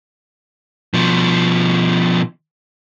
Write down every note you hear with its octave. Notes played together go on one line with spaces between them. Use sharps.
B2 F3